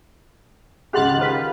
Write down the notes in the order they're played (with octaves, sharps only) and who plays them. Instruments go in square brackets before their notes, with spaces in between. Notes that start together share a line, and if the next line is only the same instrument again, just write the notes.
[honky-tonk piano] C#2 G4 [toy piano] G#4 F#5 C6 [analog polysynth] F6 F#6 A6
[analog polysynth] D#3 F4 B4